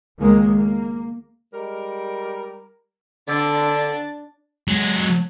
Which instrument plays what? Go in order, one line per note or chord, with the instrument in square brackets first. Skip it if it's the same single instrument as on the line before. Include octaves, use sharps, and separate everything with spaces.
[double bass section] C#2 D#3 G#3 A#3
A#3
[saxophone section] G3 G#3 A#4
[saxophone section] D3 [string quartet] D4 A6
[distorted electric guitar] F#3 G#3